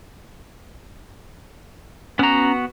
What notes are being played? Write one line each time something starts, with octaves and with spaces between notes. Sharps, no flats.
B3 C#4 F#4 A#5